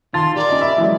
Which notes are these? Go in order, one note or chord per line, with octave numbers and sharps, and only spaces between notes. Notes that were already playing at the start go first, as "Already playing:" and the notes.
D#3 F4 A5 C6 A6
G4 A#4 D5
C#4 D#5
E5 B5
E3 F#3 G#3